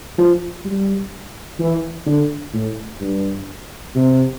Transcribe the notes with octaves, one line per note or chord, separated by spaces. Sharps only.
F3
G3
E3
D3
A2
G2
C3